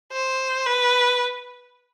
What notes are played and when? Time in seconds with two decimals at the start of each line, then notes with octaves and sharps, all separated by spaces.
0.13 C5
0.66 B4